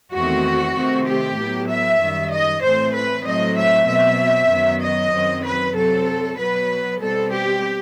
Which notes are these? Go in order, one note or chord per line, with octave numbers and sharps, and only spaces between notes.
E2 D#3 A3 C4 F#4
C3 D#3 A3 C4
G4
A2 F#3 B3
E5
F#2 D#3 G3
D#5
A2 E3 A3 C4 C5
B4
A2 F#3 A3 C4 D#5
E5
B2 F#3 C4 E5
F#2 D#3 F#3 B3
D#5
F#2 D#3 F#3 C4
B4
C3 F#3 C4 A4
B2 F#3 B3 B4
B2 G3 C4 A4
G4